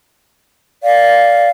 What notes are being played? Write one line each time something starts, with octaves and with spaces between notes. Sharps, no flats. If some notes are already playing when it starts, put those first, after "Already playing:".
D5 F5